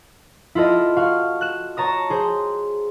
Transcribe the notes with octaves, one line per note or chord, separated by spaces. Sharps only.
E4 F4 A4 D#5
F#4 F5
F#6 E7
C#5 A5 A#5 D#6
G#4 C5